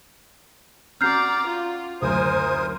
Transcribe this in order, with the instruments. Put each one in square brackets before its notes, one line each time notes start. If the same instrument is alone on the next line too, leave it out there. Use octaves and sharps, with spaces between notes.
[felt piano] C#4 F#4 [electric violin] D5 A#5 [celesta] F6 G6 C7
[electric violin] F4
[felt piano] F#1 D2 [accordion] A#4 C5 D#6 [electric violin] G#5